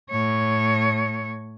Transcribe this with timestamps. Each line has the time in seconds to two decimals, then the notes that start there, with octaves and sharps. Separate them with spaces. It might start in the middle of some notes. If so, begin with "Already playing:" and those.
0.10 A2 C#5